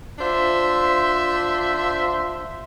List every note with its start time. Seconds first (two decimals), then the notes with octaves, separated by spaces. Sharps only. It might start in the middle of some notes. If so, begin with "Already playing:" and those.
0.19 D4 F4 C5 E5